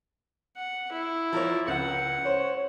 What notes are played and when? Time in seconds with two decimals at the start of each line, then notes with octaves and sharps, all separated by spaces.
0.57 F#5
0.92 E4
1.33 F3 A#4 C#5
1.68 C#2 F#5
2.26 C5 C#5